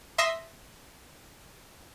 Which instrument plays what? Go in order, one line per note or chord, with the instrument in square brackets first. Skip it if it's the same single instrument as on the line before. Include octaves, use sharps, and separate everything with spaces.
[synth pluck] E5 C6 D#6 A#6